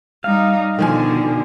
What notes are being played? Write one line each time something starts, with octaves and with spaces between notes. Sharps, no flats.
G3 D#4 F5
B2 D3 D#3 F3 G#5